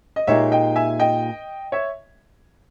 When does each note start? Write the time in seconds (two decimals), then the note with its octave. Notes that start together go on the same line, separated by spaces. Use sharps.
0.16 D#5
0.27 A#2 G#3 D#4 G4 C#5 E5
0.52 D#5 G5
0.76 E5 G#5
1.00 D#5 G5
1.72 C#5 E5